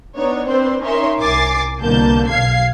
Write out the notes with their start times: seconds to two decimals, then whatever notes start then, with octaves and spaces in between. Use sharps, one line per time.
0.17 B3 D4 D#4 C#5
0.48 C4 D4 B4 C5
0.81 C#4 D#4 A#4 C#5 E5 C6
1.20 C2 A#4 G#5 D6 A6 C7
1.82 C2 B2 D3 A#3 A5 G6
2.28 B1 F5 G#6 C7